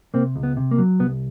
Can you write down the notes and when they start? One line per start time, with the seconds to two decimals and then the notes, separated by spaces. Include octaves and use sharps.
0.14 C3 A#3 C4
0.36 C#2
0.43 B3
0.57 C3
0.71 A#3
0.78 F#3
0.99 C2 B3